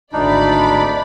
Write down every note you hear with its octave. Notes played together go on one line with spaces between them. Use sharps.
G#1 D2 D4 D#4 D5 B5